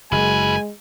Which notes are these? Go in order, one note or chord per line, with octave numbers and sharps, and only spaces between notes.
F#1 G#3 D#4 B4 G#5